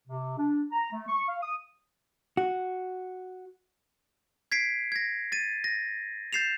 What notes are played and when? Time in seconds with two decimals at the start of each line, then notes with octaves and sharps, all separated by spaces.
0.08 C3
0.38 D4
0.72 A#5
0.91 A3
1.08 C#6
1.28 F5
1.42 D#6
2.37 F#4
4.52 G#6 B6 C7 D7
4.92 G#6 A#6
5.32 A6 D#7
5.64 A#6
6.33 G6 A6 C7 E7 F7